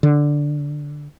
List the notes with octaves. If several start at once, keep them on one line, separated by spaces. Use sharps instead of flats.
D3